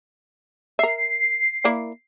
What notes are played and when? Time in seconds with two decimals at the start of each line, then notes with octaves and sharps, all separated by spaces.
0.79 A#4 E5 C7
1.64 A#3 E4 D5